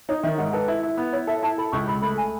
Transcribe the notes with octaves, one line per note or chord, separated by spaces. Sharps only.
D#4 C#5
D#3 E5
G#2 F#5
A4 B4
E4
E4
B3
E4 C#5
A4 E5
E4 A5
A4 B5
C#2 C#6
C#2 B5
A3 B5
G#5